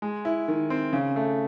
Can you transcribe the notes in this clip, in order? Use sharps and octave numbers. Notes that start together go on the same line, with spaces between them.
G#3
E4
D#3
C4
C#3
A3